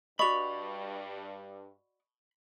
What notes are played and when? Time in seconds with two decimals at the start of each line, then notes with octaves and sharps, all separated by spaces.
0.19 G2 F#4 D5 D#5 B5 C#6 F7